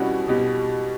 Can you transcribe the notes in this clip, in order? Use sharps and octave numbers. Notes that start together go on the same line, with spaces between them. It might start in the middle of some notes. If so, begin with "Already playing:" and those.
Already playing: B2 G3 C#4 E4 F#4
B2 G4